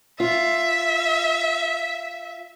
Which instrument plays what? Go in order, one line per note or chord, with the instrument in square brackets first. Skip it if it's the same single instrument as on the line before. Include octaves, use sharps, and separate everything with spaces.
[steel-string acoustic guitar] F4 [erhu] E5